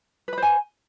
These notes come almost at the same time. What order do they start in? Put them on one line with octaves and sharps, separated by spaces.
B4 B5 C5 G#5